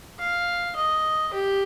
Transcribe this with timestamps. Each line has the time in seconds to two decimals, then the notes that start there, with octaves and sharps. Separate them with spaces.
0.19 F5
0.76 D#5
1.33 G4